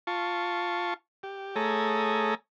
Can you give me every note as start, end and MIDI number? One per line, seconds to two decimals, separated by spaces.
0.07 0.94 65
0.07 0.94 81
0.07 0.94 85
1.23 1.55 67
1.56 2.35 57
1.56 2.35 68
1.56 2.35 69
1.56 2.35 73
1.56 2.35 82
1.56 2.35 87